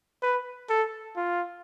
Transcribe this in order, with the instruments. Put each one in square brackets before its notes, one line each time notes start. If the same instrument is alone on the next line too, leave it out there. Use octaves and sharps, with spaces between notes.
[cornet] B4
A4
F4